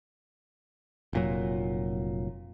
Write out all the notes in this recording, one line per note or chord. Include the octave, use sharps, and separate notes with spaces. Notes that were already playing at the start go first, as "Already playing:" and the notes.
F1 A#2 F#3